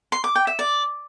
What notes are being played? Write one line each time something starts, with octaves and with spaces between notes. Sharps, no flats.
C6
D6
G5
E5
D5